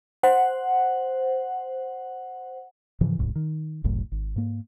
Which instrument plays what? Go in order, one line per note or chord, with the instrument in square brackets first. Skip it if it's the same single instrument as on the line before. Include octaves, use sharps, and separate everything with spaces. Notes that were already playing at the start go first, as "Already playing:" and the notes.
[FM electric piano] C5 F#5
[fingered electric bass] G#2 C#3 E3 F3
D1 C2 G#2
D#3
F#1 C2 F#2 A2
G#1
G#2 A#3